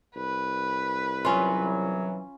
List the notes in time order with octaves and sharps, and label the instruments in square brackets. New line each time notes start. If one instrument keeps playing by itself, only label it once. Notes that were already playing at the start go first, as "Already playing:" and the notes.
[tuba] C2 [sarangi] B4
[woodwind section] E3 F#3 [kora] C#4 F4